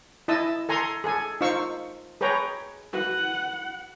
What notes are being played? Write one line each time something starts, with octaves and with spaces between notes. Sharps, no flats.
E4 D#5 A5 D#6 E6
A4 G#5 A#5 C6
G#4 A4 G#5
D#4 F4 C5 F5 C#6 E6
G#4 B4 C#5 G5 A#5
F#4 B4 F#5